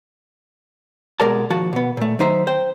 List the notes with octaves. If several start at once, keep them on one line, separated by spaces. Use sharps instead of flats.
C2 B2 G#3 A#4 D5 A5
D#2 F3 F#4 A5
B2 B3
A#2 A3
D#3 F#3 D#4 C5 E5
C5 G5